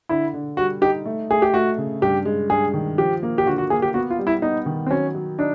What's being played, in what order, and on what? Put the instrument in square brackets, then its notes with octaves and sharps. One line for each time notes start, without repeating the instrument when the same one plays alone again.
[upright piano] D3 [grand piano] E4
[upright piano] D3
[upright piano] G3 [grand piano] F#4
[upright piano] D#4 [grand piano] G4
[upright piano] A3
[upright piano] A3 [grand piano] G#4
[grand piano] G4
[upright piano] A3 [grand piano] F#4
[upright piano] C#3
[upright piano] G2 [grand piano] G4
[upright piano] G#3
[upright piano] G2 [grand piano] G#4
[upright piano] D#3
[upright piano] F3 [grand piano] G4
[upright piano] A#3
[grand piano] G4
[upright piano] D3 [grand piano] F#4
[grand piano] F#4
[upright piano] A#3 [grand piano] G#4
[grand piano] G4
[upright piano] B3 [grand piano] F#4
[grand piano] F4
[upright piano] G3
[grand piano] E4
[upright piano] B3 [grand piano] D#4
[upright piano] D#3
[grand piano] C4
[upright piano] F#3 [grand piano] C#4
[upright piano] F#3
[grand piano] D4 [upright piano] D#4